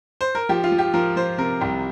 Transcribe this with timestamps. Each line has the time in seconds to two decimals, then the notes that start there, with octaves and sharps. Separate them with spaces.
0.21 C5
0.35 A#4
0.49 F3 G4
0.64 F4
0.72 F3
0.78 G4
0.93 F3 A#4
1.16 F3 C5
1.38 C3 A#4
1.61 C2 G4